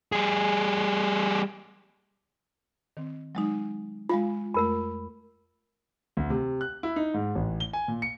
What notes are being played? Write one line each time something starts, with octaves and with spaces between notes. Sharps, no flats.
G3 G#4
D#3 C4
F#3 G#3 D#4
G#3 F4 F5 B5
F2 A3 A#4 B5
D2
C3
F#6
E4
D#4
G#2
A1
G7
G#5
A#2
C#7